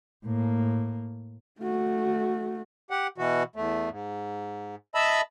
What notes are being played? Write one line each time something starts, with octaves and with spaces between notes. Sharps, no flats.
A2 A#3
A3 F#4
G4 F#5
B2 E3 F#4
E2 A3
G#2
D#5 E5 A5 B5 E6